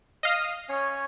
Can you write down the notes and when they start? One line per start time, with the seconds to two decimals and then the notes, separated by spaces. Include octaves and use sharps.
0.23 D#5 F5 D#6
0.69 C#4 C#5